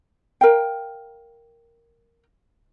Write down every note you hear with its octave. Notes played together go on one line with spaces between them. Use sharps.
A#4 F5 G5